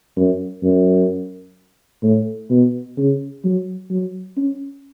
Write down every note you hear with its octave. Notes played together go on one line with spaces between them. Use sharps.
F#2
F#2
A2
B2
C#3
F#3
F#3
C#4